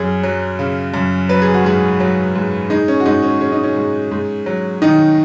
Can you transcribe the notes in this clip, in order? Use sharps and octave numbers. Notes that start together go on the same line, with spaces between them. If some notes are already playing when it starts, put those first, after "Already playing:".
Already playing: F#2 G#4
F#3
C#3
F#2
F#3 B4
G#4
F#4
G#2 G#4
F#3
G#2
G#3 D#4
C#4
F#4
G#2 D#4
C#4
G#3 C#4
D#4
C#4
G#2
G#2
F#3
D#3 D#4